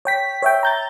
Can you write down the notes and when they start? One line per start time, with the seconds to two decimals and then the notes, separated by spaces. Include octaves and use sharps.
0.05 C#5 G5 B6
0.42 C#5 E5 G5
0.63 A#5 G6 A6